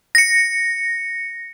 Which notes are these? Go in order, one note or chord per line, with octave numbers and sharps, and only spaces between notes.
A#6 C#7